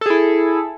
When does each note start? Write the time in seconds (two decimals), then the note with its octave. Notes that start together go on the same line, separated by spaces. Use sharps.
0.01 A4
0.06 G#4
0.10 E4